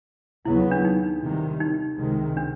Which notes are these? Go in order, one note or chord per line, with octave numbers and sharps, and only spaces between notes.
D#2 C#3 F#3 B3 E4
D4
D#4
C3 D#3 G3
D#4
C#2 C3 D#3 G#3
D4